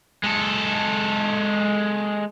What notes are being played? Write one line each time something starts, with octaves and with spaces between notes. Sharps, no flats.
G#3 A4